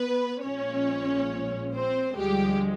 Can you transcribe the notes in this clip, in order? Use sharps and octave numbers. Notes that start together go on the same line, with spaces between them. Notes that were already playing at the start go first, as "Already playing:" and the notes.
Already playing: B3 B4
A#1 A#2 F3 G#3 C#4 C#5
C4 C5
D2 D3 F3 G3 G#3 G4